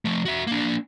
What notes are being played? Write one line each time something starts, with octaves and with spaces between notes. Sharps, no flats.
F3 A3
F#4 E5
A#3 D4